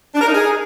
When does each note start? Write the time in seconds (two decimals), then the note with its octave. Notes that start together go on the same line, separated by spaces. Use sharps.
0.15 D4
0.21 A#4
0.27 D#4
0.34 G#4